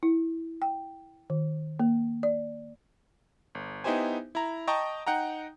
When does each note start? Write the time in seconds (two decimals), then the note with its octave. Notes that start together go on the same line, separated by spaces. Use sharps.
0.03 E4
0.62 G5
1.30 D#3
1.80 A#3
2.23 D5
3.55 G1
3.84 B3 D#4 E4 G4 C5 G#5
4.35 E4 A#5
4.67 D#5 G5 A5 A#5 C#6 D#6
5.07 D#4 F#5 G5 A#5